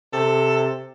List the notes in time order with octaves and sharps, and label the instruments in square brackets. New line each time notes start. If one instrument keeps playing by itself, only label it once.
[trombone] C3 [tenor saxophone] A4